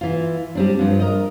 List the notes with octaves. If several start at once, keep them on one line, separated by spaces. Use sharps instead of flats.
E3 F4
G3 C4 D4
G2 F3
A#4 D#5